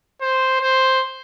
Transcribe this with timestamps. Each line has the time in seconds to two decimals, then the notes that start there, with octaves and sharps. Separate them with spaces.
0.22 C5
0.61 C5